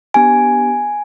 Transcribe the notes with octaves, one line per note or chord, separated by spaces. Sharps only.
B3 D4 G4 G#5